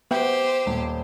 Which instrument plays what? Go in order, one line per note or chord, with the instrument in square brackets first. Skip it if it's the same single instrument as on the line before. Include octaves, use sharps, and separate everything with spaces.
[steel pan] B3 E5 G5 [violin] G4 C5
[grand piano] D#1